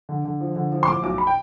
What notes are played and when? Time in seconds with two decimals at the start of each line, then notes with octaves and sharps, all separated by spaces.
0.09 D3
0.25 D3
0.40 F3
0.56 D3
0.72 F3
0.83 C6
0.88 A2 D6
1.03 B1 D6
1.18 B5
1.27 G5